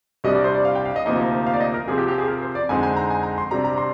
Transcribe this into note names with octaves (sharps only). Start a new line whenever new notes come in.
C2 C3 G3 D4 D#5
D5
C5
D5
F5
G5
F5
D#5
D2 C3 F3 A#3 D#4 D#5
F5
D5
D#5
A#4
C3 F3 C4 G#4
G4
G4
G#4
A#4
C5
D5
F2 D3 G#3 C4 D#4 G#5
G#5
A#5
G#5
A#5
C6
C3 G3 D4 A#5
A#5
C6